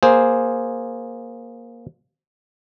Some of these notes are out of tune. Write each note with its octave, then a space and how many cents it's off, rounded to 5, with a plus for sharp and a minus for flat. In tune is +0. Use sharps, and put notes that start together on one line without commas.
A#3 +10 G#4 +0 C5 +0